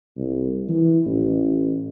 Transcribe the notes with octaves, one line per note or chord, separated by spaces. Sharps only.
C2
E3
A1